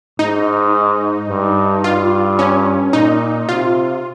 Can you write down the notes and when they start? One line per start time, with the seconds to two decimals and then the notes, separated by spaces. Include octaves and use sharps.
0.19 G#2 D#4
1.29 G2
1.84 G2 F4
2.39 C#4
2.93 A#2 D#4
3.49 C3 F4